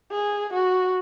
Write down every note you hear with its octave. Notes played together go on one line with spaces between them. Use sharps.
G#4
F#4